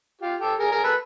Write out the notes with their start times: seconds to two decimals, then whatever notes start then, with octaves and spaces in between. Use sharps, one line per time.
0.22 F4 G4
0.40 G4 A4
0.59 G#4 A#4
0.71 G#4 A#4
0.84 A4 B4